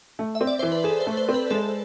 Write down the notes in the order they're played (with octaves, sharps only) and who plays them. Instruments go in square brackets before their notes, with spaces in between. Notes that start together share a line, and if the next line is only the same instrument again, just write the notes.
[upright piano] A3
[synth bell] E5
[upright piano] C4
[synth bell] D5
[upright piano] E3 [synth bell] C5
[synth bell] B4
[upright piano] G#4 [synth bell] A4
[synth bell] C5
[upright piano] A3
[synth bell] C5
[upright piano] C4
[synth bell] B4
[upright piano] G#3 [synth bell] A4